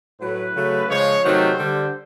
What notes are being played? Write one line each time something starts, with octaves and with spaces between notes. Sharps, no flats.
A2 F#3 A3 B4
C#3 F#3 A3
C#3 F3 G#3 C#5
C3 D#3 F#3 A3 C5
D3 G3